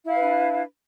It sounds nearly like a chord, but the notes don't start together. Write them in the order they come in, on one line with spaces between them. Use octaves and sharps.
E4 F5 B4 D4